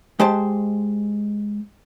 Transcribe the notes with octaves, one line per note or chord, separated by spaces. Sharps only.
G#3 G4 C5 A5